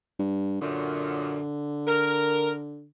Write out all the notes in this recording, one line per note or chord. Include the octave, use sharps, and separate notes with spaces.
G2
F#2 A#2 D3
A#4